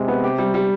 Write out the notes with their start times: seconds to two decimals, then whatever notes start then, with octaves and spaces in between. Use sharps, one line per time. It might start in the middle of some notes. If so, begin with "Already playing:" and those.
Already playing: C3 G#3
0.08 B3
0.24 G4
0.38 G3
0.54 G3